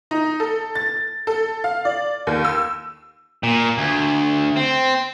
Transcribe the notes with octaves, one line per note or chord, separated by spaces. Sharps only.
D#4
A4
A6
A4
F5
D5
D#2
E6
A#2
D2
C4